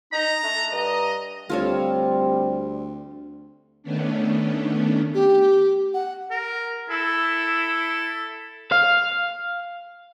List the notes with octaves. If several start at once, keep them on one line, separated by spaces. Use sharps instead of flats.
D#4 A#5
A3 D4
G2 D#5 A#5
D2 G3 C4 F4 A4 C#5
D#3 A3 B3 C#4 D4
G4
F#5
A#4
E4 A4
F5